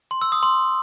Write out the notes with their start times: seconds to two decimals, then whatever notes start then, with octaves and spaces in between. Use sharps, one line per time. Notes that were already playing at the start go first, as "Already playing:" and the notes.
0.11 C6
0.21 E6
0.32 D#6
0.43 C6